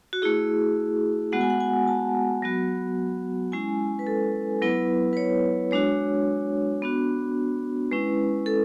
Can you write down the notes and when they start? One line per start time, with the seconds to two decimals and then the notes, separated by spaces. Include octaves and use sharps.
0.13 F#4
0.22 A3 E4 G#4
1.32 G#3 B3 F#4 F#5
1.41 G#5
1.50 F#5
1.60 G#5
1.88 A5
2.42 F#3 B3 F#4
3.52 G#3 C#4 E4 G#5
3.99 B4
4.07 A4
4.62 F#3 B3 E4 B4
5.13 B4
5.17 C#5
5.71 G#3 D4 F#4 C#5
6.82 B3 D4 F#4
7.91 G#3 C#4 E4 B4
8.46 A4